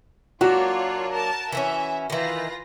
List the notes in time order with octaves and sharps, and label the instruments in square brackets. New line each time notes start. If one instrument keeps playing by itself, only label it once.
[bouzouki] F#3 A#3 D4 [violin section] F4 C#5 [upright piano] F#4
[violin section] A#4 A5
[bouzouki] E3 A3 C#4 [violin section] E5
[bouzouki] D#3 E3 [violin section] F4 B4 A#6